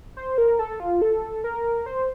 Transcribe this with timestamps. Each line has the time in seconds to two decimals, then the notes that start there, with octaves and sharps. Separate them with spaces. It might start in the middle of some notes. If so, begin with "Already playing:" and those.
0.17 C5
0.38 A#4
0.59 A4
0.80 F4
1.02 A4
1.44 A#4
1.86 C5